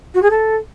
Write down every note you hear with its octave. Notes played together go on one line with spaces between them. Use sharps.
F#4
G#4
A4